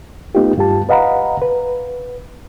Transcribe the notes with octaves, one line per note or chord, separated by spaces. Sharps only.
A3 B3 D#4 F4 G4
G2 F4 G4 A5
B4 D#5 F5 F#5 A#5 B5
B4